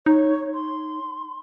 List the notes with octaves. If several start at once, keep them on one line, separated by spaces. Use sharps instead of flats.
D#4 C#5
C6